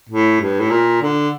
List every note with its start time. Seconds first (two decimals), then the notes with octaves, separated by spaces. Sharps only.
0.09 A2
0.41 G2
0.60 A2
0.71 A#2
1.02 D3